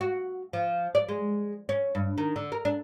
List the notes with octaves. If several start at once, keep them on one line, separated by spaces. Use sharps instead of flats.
F#4
F3
D5
G#3
C#4
G2
D#3
D3
A#4
D4